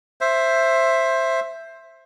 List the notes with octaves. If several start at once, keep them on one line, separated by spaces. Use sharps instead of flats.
C5 E5